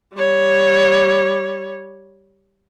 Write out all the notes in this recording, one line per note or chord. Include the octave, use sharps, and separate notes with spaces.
G3 C#5